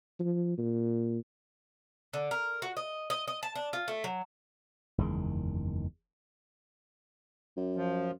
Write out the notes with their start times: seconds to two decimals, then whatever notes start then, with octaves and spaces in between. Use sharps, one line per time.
0.20 F3
0.58 A#2
2.13 D3
2.31 A#4
2.62 F#4
2.77 D#5
3.10 D#5
3.28 D#5
3.43 A5
3.55 D4
3.73 F4
3.88 A3
4.04 F#3
4.98 F#1 E2 D#3 G#3
7.57 F#2
7.76 F3